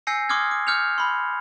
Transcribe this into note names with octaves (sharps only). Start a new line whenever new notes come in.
G#5 E6 G6 A#6 C7 C#7
C6 D6 D#6 F6 G#6
D6
D6 F6 G6 C#7 F7
B5 C6